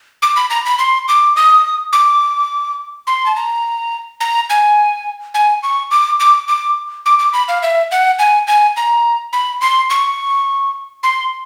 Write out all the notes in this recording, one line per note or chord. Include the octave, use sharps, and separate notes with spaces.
D6
B5
A#5
B5
C6
D6
D#6
D6
C6
A5
A#5
A#5
G#5
G#5
C#6
D6
D6
D6
D6
D6
B5
F5
E5
F#5
G#5
G#5
A#5
B5
C6
C#6
C6